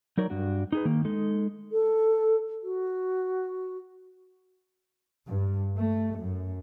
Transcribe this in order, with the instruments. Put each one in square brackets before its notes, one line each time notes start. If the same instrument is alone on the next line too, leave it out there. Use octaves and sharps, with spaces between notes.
[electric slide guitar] F#3 D#4 A#4 C#5 D5
G2 D4 F#4
D#4 G#4 B4
D#3 A#3
G#3 D#4 A4
[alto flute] A4
F#4
[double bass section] G2
A3
F#2